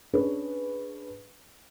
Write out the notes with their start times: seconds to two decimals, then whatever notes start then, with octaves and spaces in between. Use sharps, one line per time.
0.13 C#4 D4 G#4 B4 C#5